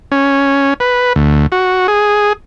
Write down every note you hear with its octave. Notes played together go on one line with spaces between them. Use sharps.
C#4
B4
D2
F#4
G#4